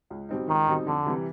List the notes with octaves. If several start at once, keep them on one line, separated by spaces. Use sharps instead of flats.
C#2
B2 G3 C4 D#4
C#2 D#3
B2 G3 C4 D#4
F2 D3
C3 E3 G3